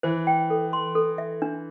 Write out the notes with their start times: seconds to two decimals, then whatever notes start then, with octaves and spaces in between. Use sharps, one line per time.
0.03 E3 C5
0.27 G5
0.50 A4
0.73 C6
0.95 A4
1.18 E5
1.42 D4